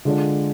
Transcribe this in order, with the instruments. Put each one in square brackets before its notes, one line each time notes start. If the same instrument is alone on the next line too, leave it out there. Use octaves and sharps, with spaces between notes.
[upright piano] D3 G#3 D4 F4